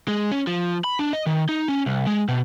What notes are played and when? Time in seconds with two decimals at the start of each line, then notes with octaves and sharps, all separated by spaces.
0.08 G#3
0.32 C#4
0.47 F3
0.84 B5
0.99 D4
1.13 D#5
1.26 D#3
1.49 D#4
1.68 C#4
1.86 C2
2.07 G#3
2.28 B2